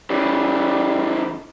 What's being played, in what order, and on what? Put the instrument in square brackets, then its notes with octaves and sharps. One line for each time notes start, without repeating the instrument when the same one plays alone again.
[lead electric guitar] C#3 E3 [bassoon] G3